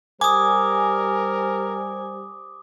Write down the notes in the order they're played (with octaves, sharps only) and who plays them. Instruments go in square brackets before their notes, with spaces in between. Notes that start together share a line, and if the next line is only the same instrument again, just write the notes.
[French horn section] G3 G4 C5 [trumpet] A#4 [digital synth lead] G#5 [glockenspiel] D6 D#6